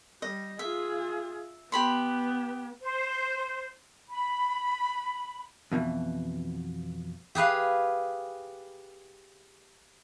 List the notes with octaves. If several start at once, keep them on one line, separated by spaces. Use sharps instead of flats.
G3 D#5
F4 G#4 E5
B3 G4 B5 C6
C5
B5
F2 B2 D#3 E3
G4 G#4 B4 F5